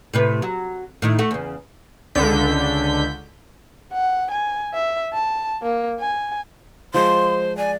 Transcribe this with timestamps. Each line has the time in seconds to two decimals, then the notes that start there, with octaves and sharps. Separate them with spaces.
0.14 A2 C3 B4
0.42 F#3
1.02 A2 D#3 E4
1.19 A3 F#4
1.31 E2 C#3
2.15 C#2 D3 G6 B6
3.93 F#5
4.31 G#5
4.74 E5
5.14 A5
5.63 A#3
6.00 G#5
6.94 F3 G#3 C5 C6
7.57 D5 G#5